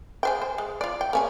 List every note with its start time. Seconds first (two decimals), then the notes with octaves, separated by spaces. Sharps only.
0.23 G#4 C5 G5
0.42 C5
0.58 G#3
0.81 F4 D5
1.01 G5
1.13 A#3 C#4 G#4